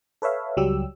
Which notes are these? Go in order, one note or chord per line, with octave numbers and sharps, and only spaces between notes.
A4 B4 C#5 E5 F5
C#2 F#3 G3 G4 E6